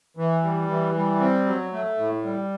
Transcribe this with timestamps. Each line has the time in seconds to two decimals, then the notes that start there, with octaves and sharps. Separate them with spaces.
0.17 E3
0.43 G3
0.68 E3
0.94 G3
1.20 C4
1.46 F#3
1.72 A3
1.98 A2
2.23 G3